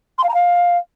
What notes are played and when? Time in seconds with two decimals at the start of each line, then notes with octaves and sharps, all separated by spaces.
0.18 C6
0.23 F5
0.29 A#5
0.34 F5